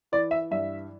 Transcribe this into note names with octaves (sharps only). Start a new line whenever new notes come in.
E3 D5
E5
G2 E5